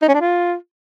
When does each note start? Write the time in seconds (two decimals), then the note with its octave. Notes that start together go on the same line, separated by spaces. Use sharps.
0.02 D#4
0.08 C#4
0.14 D4
0.21 F4